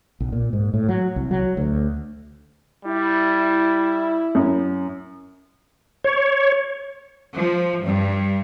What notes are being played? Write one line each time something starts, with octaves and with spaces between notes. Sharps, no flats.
B1
A#2
G#2
A2
F#3
C2
F#3
D2
G3 E4
F#2
C#5
F3
G2